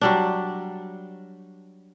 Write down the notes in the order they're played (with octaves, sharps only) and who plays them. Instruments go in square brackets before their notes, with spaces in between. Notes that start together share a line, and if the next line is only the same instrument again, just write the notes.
[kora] F#3 G3 D4